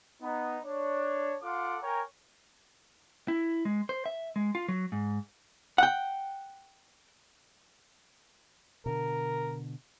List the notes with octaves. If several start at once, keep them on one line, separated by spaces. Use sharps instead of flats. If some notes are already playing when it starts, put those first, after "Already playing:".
B3 D#4
D4 C#5
F4 A4 F5 F#5 C6 D6
A#4 C#5 G5 G#5 A#5
E4
G#3
C5
E5
G#3
F4
F#3
G#2
F#5 G5
B2 D3 A#4